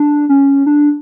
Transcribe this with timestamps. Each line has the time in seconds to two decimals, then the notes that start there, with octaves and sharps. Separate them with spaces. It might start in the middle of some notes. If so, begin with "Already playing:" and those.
Already playing: D4
0.29 C#4
0.66 D4